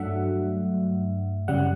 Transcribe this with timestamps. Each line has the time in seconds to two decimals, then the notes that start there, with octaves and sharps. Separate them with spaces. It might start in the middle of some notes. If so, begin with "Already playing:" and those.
Already playing: G2 F#3 A3 D4 E5 F#5
1.48 F#2 C#3 G3 F#5